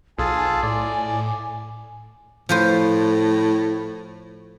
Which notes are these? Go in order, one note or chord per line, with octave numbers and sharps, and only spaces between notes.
B1 F4 G#4 A4 G#5
A2 D5
A2 F3 B4 C5